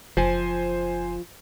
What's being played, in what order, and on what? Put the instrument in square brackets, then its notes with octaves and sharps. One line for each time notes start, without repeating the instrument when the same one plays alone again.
[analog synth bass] F#1 [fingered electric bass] F3 [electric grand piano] C5 G#5